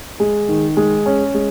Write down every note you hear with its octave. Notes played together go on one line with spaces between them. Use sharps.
G#3
D#3
G#3
C#4
G#3